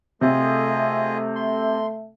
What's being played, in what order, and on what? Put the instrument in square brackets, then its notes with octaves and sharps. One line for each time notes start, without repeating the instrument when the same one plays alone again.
[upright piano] C3 [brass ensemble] A3 [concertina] F4 G#4 D#5
[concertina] C6